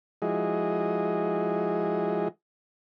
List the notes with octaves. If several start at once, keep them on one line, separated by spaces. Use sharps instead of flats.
F3 G#3 E4 F#4 G#4 D#5